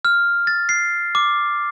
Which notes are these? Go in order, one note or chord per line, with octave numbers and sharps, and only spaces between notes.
F6
A6
C7
D6